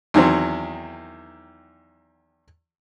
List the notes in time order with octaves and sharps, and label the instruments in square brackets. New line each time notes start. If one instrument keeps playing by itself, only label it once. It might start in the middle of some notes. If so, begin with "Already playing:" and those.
[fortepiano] E2 D#3 F#3 C4